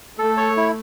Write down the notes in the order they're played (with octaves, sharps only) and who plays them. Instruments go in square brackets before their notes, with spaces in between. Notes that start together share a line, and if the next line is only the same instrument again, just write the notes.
[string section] A3 [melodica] A4
[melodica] C#5
E4